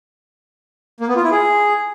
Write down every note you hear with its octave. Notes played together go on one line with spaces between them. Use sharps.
A#3
B3
F4
E4
G#4